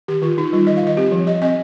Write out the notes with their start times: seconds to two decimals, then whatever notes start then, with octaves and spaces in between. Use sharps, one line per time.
0.08 D#3 G4
0.22 D#3 F4
0.37 D#3 D#4
0.53 G3 F4
0.67 D#3 D#5
0.77 F5
0.83 D#3 D#5
0.97 C4 G4
1.12 F3
1.27 F3 D#5
1.42 C4 D#5